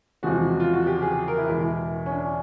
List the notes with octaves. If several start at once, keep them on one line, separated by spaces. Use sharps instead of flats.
E2 C3 F3 G#3 F#4
F4
F#4
G4
G#4
A#4
E4
E2 B2 G#3 E4
C#4
D4